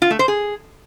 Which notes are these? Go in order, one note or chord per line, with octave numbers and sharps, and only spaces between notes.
F4
A3
C5
G#4